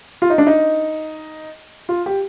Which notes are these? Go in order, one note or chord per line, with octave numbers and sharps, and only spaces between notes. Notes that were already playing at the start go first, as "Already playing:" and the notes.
F4
D#4
D4
D#4
F4
G4